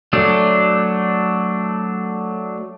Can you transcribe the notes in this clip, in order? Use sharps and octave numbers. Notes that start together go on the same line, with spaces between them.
F#3 A3 D4